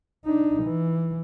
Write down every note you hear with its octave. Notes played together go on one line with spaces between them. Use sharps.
D4 D#4
E3